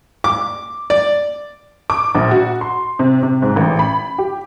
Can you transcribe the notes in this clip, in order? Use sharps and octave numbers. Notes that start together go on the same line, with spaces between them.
D6
D5
D6
A#1
F#4
C6
C3
C3
G#2
A1
B5
G4